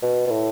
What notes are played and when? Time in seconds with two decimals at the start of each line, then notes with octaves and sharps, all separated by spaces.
0.02 B2
0.27 B2
0.31 A2